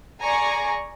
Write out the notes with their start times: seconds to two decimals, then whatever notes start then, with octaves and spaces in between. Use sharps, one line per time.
0.23 G#4 D5 G#5 A#5 C#6